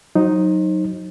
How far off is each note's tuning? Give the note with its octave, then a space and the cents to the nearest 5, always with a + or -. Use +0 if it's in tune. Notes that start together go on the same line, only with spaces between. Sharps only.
F#3 +0 D#4 +0 C5 +30